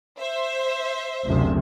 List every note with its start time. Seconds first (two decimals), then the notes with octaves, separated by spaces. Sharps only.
0.19 C5 E5
1.26 F#1 D2 C3